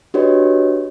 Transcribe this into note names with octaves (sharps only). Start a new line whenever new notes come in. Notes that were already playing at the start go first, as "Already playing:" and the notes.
D4 F#4 G4 B4 C#5 D#5